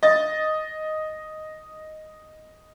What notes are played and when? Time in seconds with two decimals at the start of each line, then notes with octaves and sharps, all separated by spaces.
0.03 D#5 A6